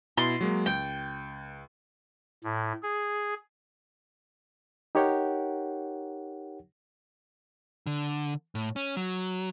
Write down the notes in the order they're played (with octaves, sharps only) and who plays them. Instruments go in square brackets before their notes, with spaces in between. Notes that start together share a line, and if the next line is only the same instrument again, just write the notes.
[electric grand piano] B2 E4 A6 [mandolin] C6
[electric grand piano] F#3 G#3 A#3
[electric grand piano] C#2 [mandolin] G5
[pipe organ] A2
G#4
[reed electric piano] D#4 G4 A#4 C#5 F#5 G5
[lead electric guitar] D3
A2
C#4
F#3